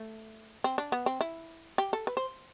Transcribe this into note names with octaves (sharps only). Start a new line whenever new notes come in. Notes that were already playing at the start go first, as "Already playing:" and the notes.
Already playing: A3
C4
D4
B3
C4
E4
G4
A4
B4
C5